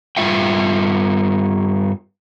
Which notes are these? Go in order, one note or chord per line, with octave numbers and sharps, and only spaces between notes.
G2 A#3 F4 E5 G5